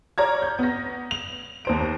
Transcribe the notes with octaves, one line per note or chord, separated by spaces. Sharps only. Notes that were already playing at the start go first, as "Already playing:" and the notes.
C#5 D5 A#5 F6 G#6
G6
B3 A#6
F7
D#2 C5 D7